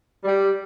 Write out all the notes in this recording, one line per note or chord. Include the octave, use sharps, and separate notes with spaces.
G3